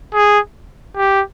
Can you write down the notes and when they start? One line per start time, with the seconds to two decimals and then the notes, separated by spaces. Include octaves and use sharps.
0.14 G#4
0.97 G4